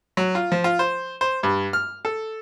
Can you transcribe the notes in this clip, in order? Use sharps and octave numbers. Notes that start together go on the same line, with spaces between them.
F#3
F4
F3
F4
C5
C5
G2
F6
A4